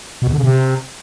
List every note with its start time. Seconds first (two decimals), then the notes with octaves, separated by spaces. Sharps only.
0.22 B2
0.27 E2
0.33 D3
0.38 C#3
0.44 C3